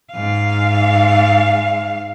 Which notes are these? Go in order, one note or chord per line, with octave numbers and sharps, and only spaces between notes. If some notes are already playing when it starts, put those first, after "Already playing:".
G#2 F5